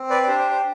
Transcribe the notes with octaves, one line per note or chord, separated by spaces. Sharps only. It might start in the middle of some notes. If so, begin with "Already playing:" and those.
Already playing: C4
B4 D5
D5
D4 G4 C5
C5
C5